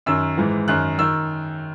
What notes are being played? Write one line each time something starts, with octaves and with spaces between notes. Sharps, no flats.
F#2 D#3 E6
G#2 E3
F#2 D#3 F#6
D#3 E6